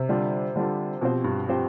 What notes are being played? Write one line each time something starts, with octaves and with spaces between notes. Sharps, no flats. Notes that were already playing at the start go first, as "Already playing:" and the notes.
Already playing: C3
D3 G3 D4 F4
D3 G3 D4 F4
B2 F3 C4 G4 C5
G2
F3 C4 G4 C5